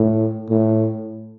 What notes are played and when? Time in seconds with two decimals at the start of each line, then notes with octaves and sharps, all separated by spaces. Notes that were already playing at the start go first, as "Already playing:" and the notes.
Already playing: A2
0.50 A2